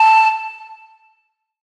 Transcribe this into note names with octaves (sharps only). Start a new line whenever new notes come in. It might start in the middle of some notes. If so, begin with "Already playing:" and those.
Already playing: A5